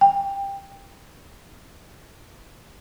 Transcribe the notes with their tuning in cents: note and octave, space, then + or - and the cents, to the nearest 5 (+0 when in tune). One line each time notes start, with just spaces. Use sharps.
G5 +15